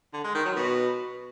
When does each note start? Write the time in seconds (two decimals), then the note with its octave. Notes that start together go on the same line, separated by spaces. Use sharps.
0.13 D3
0.24 G#3
0.35 D#3
0.45 F#3
0.56 B2